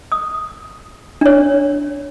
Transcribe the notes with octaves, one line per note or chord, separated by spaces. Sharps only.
D#6
D4 C#5